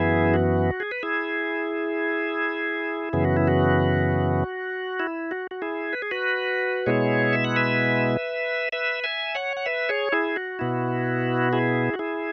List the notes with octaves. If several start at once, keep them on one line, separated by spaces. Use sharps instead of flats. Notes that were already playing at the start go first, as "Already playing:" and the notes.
Already playing: F#2 E3 B3 E4 G#4
F#4
G#4
B4
E4 G#4
F#2 C#3 E3 B3 G#4
F#4
E4
F#4
E4
F#4
F#4
E4 G#4
B4
G#4
F#4 B4
B2 G#3 B3 E4 G#4 C#5
E5
F#5
B4 E5
B4 E5
E5 G#5
C#5 F#5
F#5
B4 E5
G#4 C#5
E4 G#4
F#4
B2 B3 E4
E4 G#4
F#4
E4 G#4